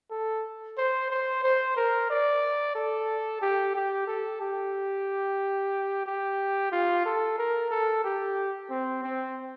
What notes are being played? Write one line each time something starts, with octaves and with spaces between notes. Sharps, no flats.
A4
C5
C5
C5
A#4
D5
A4
G4
G4
A4
G4
G4
F4
A4
A#4
A4
G4
C4
C4